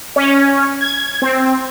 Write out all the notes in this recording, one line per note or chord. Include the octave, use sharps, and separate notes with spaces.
C#4
G#6
C4